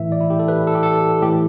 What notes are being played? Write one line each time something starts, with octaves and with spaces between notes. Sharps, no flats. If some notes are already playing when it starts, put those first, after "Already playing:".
Already playing: A2 E3 E5
D5
E4
G4
A4
B4
A4
G4
A4
A2 E3 G4